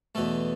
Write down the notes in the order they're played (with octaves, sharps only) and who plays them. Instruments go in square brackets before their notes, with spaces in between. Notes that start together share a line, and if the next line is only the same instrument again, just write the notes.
[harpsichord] E2 B2 A3 A4